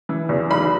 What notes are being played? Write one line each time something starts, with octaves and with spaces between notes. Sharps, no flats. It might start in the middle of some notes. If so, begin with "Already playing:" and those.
E3
E2
B1 B5